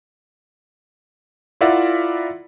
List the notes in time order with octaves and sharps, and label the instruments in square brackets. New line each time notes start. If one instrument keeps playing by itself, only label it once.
[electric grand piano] E4 F4 A#4 D5 E5 F#5